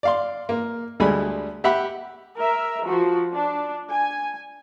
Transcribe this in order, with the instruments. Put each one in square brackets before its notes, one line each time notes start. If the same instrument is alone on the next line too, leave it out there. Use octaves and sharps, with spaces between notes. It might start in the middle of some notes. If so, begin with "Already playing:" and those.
[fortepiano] D5 F5 C6
A#3
D2 G3 G#3 G#5 B5
G4 E5 F#5 B5
[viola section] A#4 E5
F3 F#4
D4
G#5